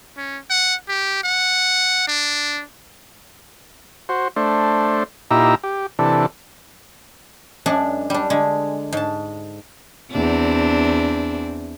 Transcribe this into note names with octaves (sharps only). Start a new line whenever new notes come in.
C#4
F#5
G4
F#5
D4
F#4 C5
A3 D4 C5
A#2 D#4 E4 G4 A#5 E6
G4
C3 E3 D4 A4
F#2 G#3 D4 F#5 G#5 A5
G3 D4
D3 G#3
G#2 A5
E2 C4 D4